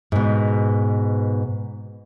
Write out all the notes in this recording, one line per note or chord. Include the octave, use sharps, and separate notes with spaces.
G#2 B2